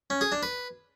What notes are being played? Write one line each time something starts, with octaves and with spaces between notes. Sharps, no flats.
C#4
G#4
D4
B4